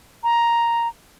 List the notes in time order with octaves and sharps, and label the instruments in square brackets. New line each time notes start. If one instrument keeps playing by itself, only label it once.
[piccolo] A#5